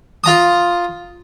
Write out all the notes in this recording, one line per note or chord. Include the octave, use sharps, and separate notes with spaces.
F4 A#5 D#6